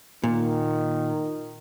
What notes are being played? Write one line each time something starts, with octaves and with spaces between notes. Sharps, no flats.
A#2 D#3